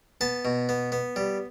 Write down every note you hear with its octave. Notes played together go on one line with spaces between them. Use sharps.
B3 A5
B2
B3
B3
G3